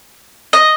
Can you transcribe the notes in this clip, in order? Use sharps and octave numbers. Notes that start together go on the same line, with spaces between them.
D#5